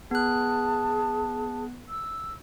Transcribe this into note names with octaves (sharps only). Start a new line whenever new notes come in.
B3 G#4 A5 F#6
E6